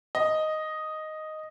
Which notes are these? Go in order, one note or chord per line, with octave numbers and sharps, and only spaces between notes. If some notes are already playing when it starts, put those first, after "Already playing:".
D#5